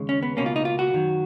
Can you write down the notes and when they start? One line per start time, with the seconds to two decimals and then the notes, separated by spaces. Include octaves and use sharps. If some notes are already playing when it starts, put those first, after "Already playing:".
Already playing: D#2 C#3 G#3
0.09 C#4
0.23 B3
0.37 C#2 B2 A#3 C#4
0.46 F4
0.56 D#4
0.65 F4
0.79 F#4
0.93 F#2 D#3 F#3